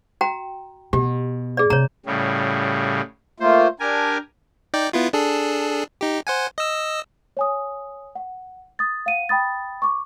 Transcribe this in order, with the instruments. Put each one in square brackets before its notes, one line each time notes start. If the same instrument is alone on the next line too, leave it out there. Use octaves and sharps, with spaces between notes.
[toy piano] F#4 G5 A#5
[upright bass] B2 [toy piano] G4
[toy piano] G#4 D5
[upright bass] C3 [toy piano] C#5 A#5
[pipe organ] A2 C#3 G3
[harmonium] A3 A#3 F4 [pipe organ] C5
[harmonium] D4 [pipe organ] G4 A#4 G#5
[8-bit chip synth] D#4 D5 G5
B3 E4 F4
D4 G#4 A4
D#4 G4
C5 F#5 G#5
D#5 E6
[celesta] C#5 G#5 D#6
F#5
D#6 A6
F5 F#5 D#7
G5 B5 D#6 A6
C#6 D6